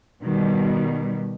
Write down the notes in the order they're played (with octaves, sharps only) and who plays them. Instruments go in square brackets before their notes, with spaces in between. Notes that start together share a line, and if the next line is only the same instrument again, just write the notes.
[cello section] B2 D#3 G3